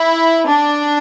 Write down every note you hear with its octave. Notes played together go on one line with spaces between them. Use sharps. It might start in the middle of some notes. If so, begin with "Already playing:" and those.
Already playing: E4
D4